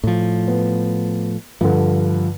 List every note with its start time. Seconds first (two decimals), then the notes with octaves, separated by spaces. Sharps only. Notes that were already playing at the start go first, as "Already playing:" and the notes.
0.04 A2 F3
0.48 B3
1.61 G2 D3 F3